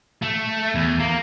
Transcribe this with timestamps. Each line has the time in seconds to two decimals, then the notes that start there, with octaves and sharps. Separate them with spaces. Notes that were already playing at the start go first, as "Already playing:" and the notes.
0.22 A3
0.75 E2
1.00 A#3